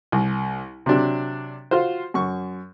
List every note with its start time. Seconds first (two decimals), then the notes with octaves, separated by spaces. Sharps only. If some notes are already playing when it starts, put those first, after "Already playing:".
0.12 C2
0.86 C3 F#3 D4
1.71 F4 F#4 C5
2.14 F#2 C#6